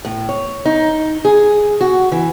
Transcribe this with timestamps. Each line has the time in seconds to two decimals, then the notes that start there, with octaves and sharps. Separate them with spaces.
0.05 A2
0.29 C#5
0.66 D#4
1.25 G#4
1.81 F#4
2.12 E3